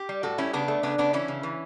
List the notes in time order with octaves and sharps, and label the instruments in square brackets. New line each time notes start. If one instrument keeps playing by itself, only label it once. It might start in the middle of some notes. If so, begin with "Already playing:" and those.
Already playing: [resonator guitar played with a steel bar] G4
G3
A2 F#4 A4
G3 C#4 E4
C#3 B3 D4
A3
C#3 B3 D4
C#3 B3 D4
E3 C#4 E4
C#3
E3